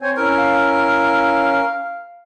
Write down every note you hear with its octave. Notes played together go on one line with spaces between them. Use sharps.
C4 C5 C#5 G#5
C4 C#4 E4 A#4
F5